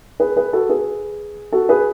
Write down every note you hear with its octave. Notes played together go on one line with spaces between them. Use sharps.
G#4 B4
G#4 B4
F#4 A4
G#4 B4
F#4 A4
G#4 B4